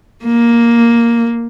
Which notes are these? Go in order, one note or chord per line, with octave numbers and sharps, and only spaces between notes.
A#3